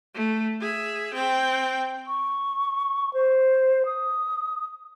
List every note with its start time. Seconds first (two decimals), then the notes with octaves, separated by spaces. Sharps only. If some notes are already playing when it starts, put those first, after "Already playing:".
0.15 A3
0.60 G#4 E5
1.14 C4 G5
2.07 C#6
3.14 C5
3.86 D#6